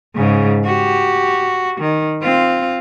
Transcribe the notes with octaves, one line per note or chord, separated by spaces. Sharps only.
G#2 C#3
F#4 G4
D#3
C4 F4